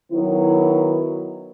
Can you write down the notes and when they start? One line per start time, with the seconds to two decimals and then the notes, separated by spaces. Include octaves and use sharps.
0.13 D#3 F#3 B3 E4